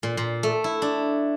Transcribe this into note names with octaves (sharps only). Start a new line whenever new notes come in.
A#2
A#2
A3
E4
D4